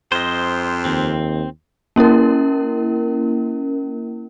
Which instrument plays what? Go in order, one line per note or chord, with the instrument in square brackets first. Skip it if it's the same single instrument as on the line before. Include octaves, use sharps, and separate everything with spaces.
[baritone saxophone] F2 [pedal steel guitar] C5 D#5
[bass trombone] D#2 [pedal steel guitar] C4
[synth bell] A#3 C#4 E4 A#4